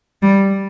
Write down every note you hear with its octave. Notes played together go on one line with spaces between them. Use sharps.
G3